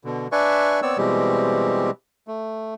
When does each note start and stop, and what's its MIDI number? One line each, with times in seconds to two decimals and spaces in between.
0.04 0.27 47
0.04 0.27 50
0.32 0.80 62
0.32 0.80 71
0.32 0.80 74
0.32 0.80 76
0.32 0.80 80
0.32 0.80 85
0.82 0.98 59
0.82 0.98 60
0.82 0.98 73
0.82 0.98 74
0.82 0.98 88
0.98 1.90 47
0.98 1.90 52
0.98 1.90 55
0.98 1.90 56
0.98 1.90 60
0.98 1.90 67
2.27 2.74 57